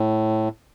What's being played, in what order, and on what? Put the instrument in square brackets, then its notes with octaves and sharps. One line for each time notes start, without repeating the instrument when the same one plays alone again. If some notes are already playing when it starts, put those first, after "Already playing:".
Already playing: [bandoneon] A2